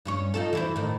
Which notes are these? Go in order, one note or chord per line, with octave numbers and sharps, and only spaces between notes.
G2 C#4 C#5
D#4 F4 A4
E3 E4 C5
A2 D#3